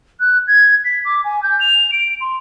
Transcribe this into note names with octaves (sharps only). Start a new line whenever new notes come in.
F#6
G#6
B6
D6
G#5
G6
F7
D7
C6